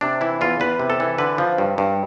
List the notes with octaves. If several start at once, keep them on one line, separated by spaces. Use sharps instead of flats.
C3 D4
E3 E4
E2 F4
E2 B4
C3
A4
E3
D3 B4
F3
G2
G2